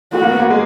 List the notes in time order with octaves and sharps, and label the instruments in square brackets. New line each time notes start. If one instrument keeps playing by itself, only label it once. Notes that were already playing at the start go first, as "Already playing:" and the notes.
[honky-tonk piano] A3 [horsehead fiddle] F#4
[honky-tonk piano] A#3
B3
A#3
G#3